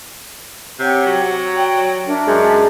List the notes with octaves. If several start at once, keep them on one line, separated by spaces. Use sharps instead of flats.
C3 G4 C#5 F#5
F#3
D5 G5
C#5
D4 A#4 E5
F#2 G#3